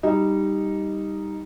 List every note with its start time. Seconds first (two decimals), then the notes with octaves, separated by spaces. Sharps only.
0.03 G3 D#4